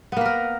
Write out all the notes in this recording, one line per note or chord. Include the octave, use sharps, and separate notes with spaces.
A#3 B3 A#4 B4